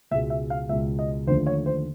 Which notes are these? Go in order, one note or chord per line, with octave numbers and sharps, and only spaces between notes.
C#2 B2 G#3 E5
E5
F5
C#2 B2 G#3 E5
D#5
D#2 D3 F3 A3 C5
C#5
C5